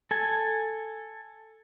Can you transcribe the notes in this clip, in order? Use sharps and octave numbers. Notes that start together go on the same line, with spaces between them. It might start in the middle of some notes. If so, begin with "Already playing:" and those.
A4 G#5